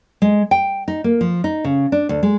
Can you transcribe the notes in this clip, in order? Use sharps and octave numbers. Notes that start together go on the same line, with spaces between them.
G#3
G5
D#4
A#3
F3
D#4
C#3
D4
D2
G#3